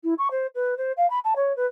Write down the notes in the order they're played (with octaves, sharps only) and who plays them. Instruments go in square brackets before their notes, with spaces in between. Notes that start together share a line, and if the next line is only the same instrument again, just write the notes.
[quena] E4
C#6
C5
B4
C5
F5
B5
A5
C#5
B4